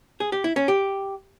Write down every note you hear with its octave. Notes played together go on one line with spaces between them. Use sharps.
G#4
G4
E4
C#4
G4